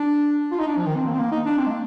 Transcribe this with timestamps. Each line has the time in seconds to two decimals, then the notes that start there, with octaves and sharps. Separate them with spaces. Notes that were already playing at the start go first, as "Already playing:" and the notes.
Already playing: D4
0.51 F4
0.59 D#4
0.67 D4
0.77 F3
0.86 D#3
0.96 C4
1.06 A#3
1.13 C4
1.19 A#3
1.31 D#4
1.46 D4
1.58 C4
1.66 G#3
1.71 A#3